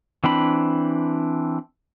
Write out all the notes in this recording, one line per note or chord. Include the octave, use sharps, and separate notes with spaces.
E3 C4 D4 B5